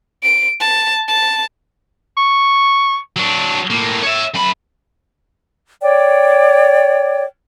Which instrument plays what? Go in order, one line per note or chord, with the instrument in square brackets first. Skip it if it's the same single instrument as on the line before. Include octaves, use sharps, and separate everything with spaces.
[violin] D7
A5
A5
[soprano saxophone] C#6
[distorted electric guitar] F#3 D4
A2 A#3
C#5 E5
F#2 B5
[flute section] C#5 D5 G5